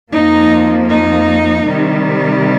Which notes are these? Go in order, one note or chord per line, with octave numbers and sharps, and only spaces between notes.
F2 F3 A#3 D#4
D#4
C3 D#3 G3